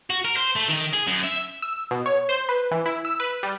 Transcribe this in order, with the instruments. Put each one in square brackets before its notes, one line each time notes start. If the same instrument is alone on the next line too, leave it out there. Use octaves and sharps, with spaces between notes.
[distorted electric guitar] F#4
A#4
C5
A3
D#3
G#4
F#2
E5
[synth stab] E6
B2
C#5
C5
B4
E3
E4
E6
B4
G3